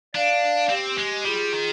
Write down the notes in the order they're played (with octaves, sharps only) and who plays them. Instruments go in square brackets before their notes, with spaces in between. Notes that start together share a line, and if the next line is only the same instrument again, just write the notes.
[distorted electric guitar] D4 [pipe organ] D5 F5
[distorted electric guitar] C4 [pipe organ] G4
[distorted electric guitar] G#3
[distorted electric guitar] G3 [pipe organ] F4 G#4
[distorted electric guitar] D#3